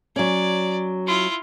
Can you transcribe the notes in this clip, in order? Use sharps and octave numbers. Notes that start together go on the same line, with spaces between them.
F#3 C#4 D5
E4 F4